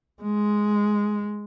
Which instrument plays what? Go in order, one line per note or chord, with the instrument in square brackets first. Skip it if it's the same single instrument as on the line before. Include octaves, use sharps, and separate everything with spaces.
[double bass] G#3